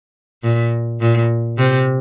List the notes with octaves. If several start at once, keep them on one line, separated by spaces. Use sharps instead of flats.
A#2
A#2
C3